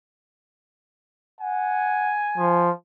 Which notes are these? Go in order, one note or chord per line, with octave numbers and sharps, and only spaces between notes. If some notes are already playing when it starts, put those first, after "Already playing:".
F#5 G#5
F3